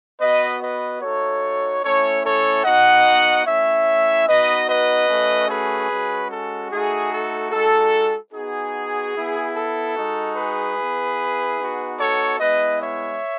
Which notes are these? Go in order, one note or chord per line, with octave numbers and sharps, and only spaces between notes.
B3 F#4 B4 D#5
B4 D#5
A3 D#4 F#4 A4 C#5
A3 C#4 E4 A4 C#5
A4 C#5
B3 D#4 F#4 D#5 F#5
A3 C#4 E4 C#5 E5
B3 D#4 F#4 B4 D#5
B4 D#5
A3 C#4 F#4
G#4 B4
G#3 C#4 F#4
A4
A3 D#4 F#4 G#4
A4
G#3 D#4 F#4 A4
B3 D#4 F#4 G#4
B3 E4
A4
G#3 D#4 F#4
G#4 B4
B3 E4
B3 D#4 F#4
A4 C#5
G#3 B3 E4 B4 D#5
C#5 E5